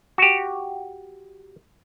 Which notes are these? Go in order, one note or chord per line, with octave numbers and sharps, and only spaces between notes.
F#4 G4